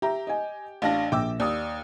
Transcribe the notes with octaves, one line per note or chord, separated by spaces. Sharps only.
G4 E5 A#5
D#5 G#5
A1 D4 F5 A5 A#6
A#1 G5 D6 E6
D#2 D5 D#6